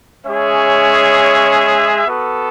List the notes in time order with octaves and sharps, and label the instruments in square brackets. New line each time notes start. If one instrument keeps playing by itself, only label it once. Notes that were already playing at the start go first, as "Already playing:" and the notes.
[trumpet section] G#3 C#4 G#4 C#5 E5
B3 F#4 A4